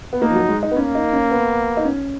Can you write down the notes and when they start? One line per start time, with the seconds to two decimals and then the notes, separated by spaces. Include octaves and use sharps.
0.13 B3
0.22 A#3 D#4
0.30 F3
0.35 F#3
0.49 G#3
0.63 D#4
0.71 B3
0.76 A#3 C#4
0.95 D#4
1.13 C#4
1.31 B3
1.77 D#4
1.85 C#4